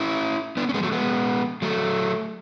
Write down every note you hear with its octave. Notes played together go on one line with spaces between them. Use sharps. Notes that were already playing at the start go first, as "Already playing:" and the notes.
Already playing: C#4 E4
B3 D4
C#4
G#3 B3
F#3 A3
G#3 B3
F#3 A3